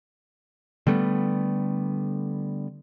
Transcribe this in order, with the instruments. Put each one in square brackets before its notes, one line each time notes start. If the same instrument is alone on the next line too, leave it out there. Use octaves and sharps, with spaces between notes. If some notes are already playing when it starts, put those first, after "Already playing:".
[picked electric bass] D3 G3 A3 B3